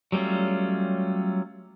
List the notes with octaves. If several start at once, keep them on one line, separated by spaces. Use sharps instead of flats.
F#3 G3 A3 C#4 F4